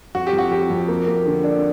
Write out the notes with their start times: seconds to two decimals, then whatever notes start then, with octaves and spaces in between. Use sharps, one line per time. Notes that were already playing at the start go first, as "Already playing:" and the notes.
0.15 F2 F#4
0.27 G4
0.33 F2
0.39 F#4
0.51 F2 G4
0.70 F2
0.88 A#3
1.07 A#3
1.26 D3
1.44 D4